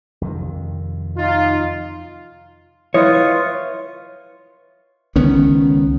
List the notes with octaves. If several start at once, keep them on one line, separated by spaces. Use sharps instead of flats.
F2 C3 D#3
D#4 F4
E4 F4 B4 C#5 D#5 E5
C#2 D#3 B3 C#4